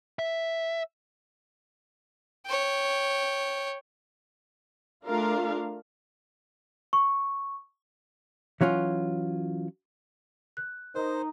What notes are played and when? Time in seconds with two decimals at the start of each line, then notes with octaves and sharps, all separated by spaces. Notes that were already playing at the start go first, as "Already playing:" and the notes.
0.19 E5
2.46 C#5 G5
5.06 A3 D4 F4 A#4 F5
6.93 C#6
8.61 E3 F#3 C#4 F4
10.57 F#6
10.95 D#4 A#4 C5